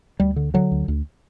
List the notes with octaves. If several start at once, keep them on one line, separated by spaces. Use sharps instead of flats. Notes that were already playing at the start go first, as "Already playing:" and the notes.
D2 G3
D3
D3 F#3
D2
D2